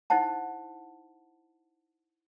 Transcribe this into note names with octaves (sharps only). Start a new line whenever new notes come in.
D#4 E4 C5 F#5 A5